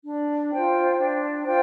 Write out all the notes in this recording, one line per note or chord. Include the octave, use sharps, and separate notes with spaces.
D4
F4 C5 G5
D4
F4 C5 G5